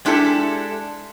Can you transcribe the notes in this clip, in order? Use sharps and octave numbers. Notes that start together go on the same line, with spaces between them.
G#3 D4 E4 G4 A4